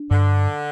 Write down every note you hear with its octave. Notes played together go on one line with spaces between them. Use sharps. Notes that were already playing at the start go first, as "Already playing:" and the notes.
Already playing: D4
G2 D3